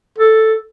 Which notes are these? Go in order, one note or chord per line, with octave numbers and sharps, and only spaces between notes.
A4